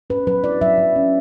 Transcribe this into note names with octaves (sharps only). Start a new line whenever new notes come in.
C#4 B4
F#3 B4
E4 D5
F#3 E5
F#3
C#4